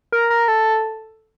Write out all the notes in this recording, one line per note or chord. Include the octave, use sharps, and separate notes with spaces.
A#4
A#4
A4